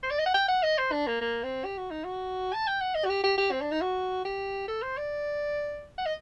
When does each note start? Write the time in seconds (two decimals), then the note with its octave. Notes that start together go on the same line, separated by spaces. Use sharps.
0.03 C5
0.11 D5
0.19 D#5
0.26 F#5
0.34 G5
0.48 F#5
0.63 D#5
0.78 C5
0.92 D4
1.07 A#3
1.21 A#3
1.43 C4
1.65 G4
1.78 F#4
1.91 D#4
2.04 F#4
2.54 A5
2.67 G5
2.81 F#5
2.95 D#5
3.05 F#4
3.09 G4
3.24 G4
3.38 G4
3.51 C4
3.61 D4
3.72 D#4
3.81 F#4
4.25 G4
4.68 A4
4.82 C5
4.97 D5
5.98 F#5
6.06 D#5